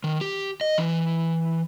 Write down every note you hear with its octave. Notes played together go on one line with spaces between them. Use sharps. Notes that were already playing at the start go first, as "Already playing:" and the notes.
D#3
G4
D#5
E3